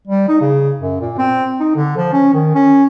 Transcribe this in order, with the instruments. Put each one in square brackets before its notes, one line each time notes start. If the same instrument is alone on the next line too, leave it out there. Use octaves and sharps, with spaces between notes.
[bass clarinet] G3
D#4
C#3
F#2
A#2
C4
D#4
D3
F3
C#4
D#3
C#4